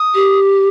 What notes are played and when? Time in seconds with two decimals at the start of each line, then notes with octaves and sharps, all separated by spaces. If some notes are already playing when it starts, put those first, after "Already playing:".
Already playing: D#6
0.15 G4